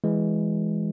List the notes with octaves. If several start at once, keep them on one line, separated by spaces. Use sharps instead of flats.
E3 G#3